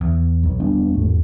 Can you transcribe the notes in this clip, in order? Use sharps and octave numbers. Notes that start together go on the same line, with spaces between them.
E2
B1
E1 G3 B3 D4
G#1 E2 A3